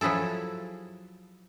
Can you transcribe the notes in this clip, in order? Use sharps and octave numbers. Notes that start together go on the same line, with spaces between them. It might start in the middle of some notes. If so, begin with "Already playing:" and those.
F3 F#3 E4 G#4 A4